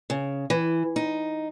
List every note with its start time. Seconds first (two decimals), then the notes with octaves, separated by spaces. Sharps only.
0.10 C#3
0.50 E3
0.96 D#4